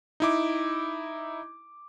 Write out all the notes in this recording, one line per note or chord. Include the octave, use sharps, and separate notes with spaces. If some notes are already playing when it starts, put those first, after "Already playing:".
D#4 E4 D6